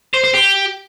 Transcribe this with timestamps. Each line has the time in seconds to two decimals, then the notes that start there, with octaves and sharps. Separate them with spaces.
0.14 C5
0.24 C5
0.34 G4